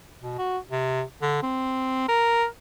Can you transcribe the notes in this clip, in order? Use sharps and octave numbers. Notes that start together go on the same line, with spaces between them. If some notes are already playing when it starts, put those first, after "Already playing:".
B2
F#4
C3
D3
C4
A#4